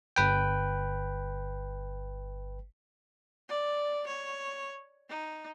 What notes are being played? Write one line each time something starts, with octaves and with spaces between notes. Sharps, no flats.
G1 B4 G5
D5
C#5
D#4